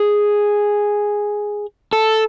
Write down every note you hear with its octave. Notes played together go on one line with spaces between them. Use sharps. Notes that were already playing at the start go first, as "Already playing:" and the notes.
Already playing: G#4
A4